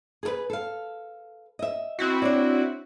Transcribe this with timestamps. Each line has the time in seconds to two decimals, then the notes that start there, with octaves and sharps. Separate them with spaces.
0.23 G#4 A4 B4
0.50 A4 F5
1.59 D#5 E5
1.99 C4 E4 F#4
2.22 D4 C#5 D5